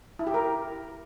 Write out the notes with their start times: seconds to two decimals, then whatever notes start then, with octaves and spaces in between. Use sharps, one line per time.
0.19 E4
0.27 G4
0.34 A#4